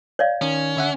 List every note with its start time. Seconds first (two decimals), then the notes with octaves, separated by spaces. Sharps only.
0.19 C#5 D5 F5
0.41 D#3 C#4
0.77 D3 E5 F#5